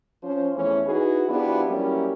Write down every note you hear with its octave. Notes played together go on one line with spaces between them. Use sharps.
F3 C#4 C5
E2 E3 A3 C#4
D#4 E4 F#4 G#4 B4
F3 B3 D4 E4 F#4 G4
F#3 G3 A#3 C#4 E4 G4